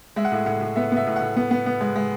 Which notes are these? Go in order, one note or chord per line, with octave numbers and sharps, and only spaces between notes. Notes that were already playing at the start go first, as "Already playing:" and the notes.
G#3 E5
F#5
A2 E5
A2 F#5
A2
B3 E5
B3
E5
A2
F#5
A2
B3
B3
B3
G#3
G#3